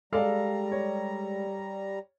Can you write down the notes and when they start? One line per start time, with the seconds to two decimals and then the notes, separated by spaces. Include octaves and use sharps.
0.13 G3 G#3 A4 D5 F5 A#5
0.72 C#5